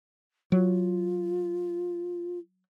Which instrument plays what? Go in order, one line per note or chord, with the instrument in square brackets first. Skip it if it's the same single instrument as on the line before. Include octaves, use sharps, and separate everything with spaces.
[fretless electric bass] F#3 [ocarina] F4